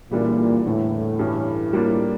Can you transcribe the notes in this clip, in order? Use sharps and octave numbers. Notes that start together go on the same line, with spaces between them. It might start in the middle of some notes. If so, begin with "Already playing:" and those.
A#2 C#3 E3 G3 D4
E2 A2 D3 A3 E4
G2 E3 G3 C#4 E4
G3 A#3 D4 F4